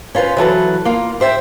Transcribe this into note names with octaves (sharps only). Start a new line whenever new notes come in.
C#4 F4 A4 B4 C5
E3 F#3 A4 B4
A#3 F4
G4 C5 E5 G5